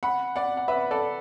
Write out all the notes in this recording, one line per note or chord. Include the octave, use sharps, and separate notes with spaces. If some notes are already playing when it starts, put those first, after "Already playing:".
F#5 B5
D5 F#5
F#5
B4 E5
A4 D5